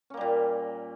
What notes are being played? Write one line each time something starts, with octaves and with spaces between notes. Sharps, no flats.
A#2 G3 A#3 C#4